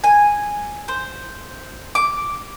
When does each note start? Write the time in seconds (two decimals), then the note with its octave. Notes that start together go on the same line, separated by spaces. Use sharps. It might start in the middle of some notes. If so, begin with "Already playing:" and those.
0.04 G#5
0.88 C5
1.95 D6